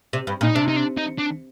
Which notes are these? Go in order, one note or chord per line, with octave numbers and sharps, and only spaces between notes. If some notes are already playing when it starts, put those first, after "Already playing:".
C3
G2
A#2
D#4
C3 D4
D#4
D4
D#4
D4